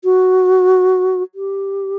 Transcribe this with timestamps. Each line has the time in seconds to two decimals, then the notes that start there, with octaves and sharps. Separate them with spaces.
0.04 F#4
1.35 G4